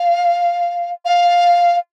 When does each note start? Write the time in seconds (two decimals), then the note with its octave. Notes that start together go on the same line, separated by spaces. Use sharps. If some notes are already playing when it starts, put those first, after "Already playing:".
Already playing: F5
1.05 F5